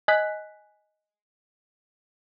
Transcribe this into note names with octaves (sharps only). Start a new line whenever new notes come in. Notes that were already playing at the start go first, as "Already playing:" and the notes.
D#5 G#5 F#6 B6